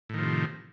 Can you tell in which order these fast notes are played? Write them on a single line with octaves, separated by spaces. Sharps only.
A2 D#3 F3 C3